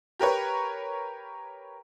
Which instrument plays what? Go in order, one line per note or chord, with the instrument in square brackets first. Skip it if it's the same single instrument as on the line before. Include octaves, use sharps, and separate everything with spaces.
[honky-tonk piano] G4 A#4 B4 C#5